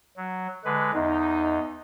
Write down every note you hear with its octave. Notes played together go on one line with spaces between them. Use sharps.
F#3
D3 G#3 B4
E2 D#4